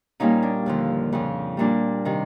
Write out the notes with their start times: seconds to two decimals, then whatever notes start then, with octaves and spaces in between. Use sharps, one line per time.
0.20 A#2 G3 A#3 C#4 D#4
0.43 D4
0.66 D#2 D3 F3
1.12 F2 C#3 F3
1.57 A#2 G3 A#3 D4
2.05 C3 D#3